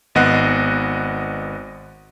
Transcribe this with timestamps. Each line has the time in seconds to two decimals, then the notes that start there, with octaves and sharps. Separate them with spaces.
0.15 G#1 B3 D#5 F#5 F#6 C7